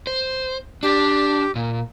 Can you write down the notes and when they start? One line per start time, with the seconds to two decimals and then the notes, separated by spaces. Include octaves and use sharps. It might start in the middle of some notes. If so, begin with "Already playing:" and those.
0.07 C5
0.83 D4 G4
1.56 A#2